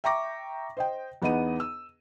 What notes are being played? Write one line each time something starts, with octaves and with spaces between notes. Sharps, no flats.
E5 G5 A#5 C#6 D6 A#6
C5 D#5 G5
E2 B3 D#4 D#5 F#5 D#7
E6